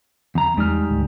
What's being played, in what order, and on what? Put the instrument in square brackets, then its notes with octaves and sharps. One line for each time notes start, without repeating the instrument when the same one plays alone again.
[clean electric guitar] E2 A#5
[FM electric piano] E2 F6 [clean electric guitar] G3 G#3 D#4
[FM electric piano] D2 G#2